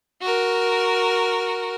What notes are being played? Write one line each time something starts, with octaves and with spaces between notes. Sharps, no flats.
F#4 A#4